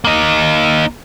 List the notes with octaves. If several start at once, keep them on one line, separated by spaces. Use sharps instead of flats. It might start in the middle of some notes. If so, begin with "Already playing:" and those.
A#3 D#4